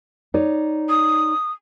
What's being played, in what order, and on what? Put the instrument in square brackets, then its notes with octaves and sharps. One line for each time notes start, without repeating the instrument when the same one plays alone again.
[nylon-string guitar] D#4 C#5 D5
[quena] D#6